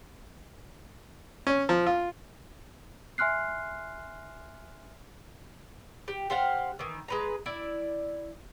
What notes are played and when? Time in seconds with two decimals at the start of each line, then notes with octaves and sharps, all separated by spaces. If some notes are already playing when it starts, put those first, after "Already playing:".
1.47 C#4
1.69 F3
1.86 F4
3.18 E5 G#5 C6 F6 F#6 C7
6.08 G4
6.30 G4 C5 F5 F#5
6.79 D#3 E3
7.08 G#3 B4 A#5
7.46 E4 D5